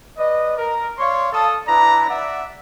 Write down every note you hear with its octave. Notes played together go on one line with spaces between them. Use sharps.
B4 D5 D#5
A#4
C#5 D5 F5 C6 C#6
A4 F5 A5 D#6
D4 E4 B4 D5 A#5
D5 E5 F#5